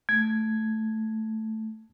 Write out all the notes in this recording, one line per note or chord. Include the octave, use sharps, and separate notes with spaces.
A3 G#6